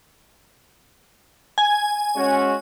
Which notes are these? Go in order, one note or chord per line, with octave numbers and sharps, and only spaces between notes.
G#5
G#3 C#4 F#4